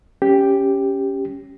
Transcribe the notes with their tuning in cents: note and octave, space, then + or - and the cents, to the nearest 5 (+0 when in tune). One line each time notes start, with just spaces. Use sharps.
C#4 +0 G4 +0